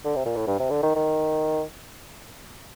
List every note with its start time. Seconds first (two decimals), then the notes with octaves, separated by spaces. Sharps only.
0.05 D3
0.16 C3
0.26 A#2
0.36 A2
0.47 G2
0.60 C3
0.70 D3
0.83 D#3
0.95 D#3